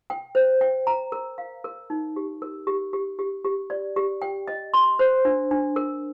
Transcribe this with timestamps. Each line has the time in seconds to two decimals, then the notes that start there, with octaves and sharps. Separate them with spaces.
0.10 G5
0.35 C5
0.61 G5
0.87 A#5
1.12 A#4
1.38 F5
1.64 A#4
1.90 D#4
2.16 G4
2.42 A#4
2.67 G4
2.93 G4
3.19 G4
3.44 G4
3.70 D5
3.96 G4
4.22 G5
4.48 D#5
4.74 C6
4.99 C5
5.25 D4
5.51 D4
5.76 A#4